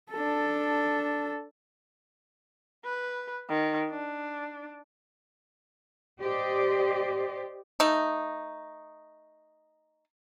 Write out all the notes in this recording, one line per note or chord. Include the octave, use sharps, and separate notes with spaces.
D4 A4
B4
D#3
D4
G4 C5 D5 D#5
A3 D#4